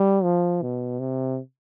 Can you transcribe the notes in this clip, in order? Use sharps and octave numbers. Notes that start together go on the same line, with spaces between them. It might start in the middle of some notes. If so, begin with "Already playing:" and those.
Already playing: G3
F3
B2
C3